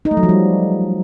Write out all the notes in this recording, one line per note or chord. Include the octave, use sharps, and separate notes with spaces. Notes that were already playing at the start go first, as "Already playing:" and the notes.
D#4
A3
F#3
F3
G3